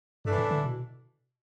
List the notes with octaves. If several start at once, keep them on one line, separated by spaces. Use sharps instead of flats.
G2 E3 A3 D4
A2
D3
B2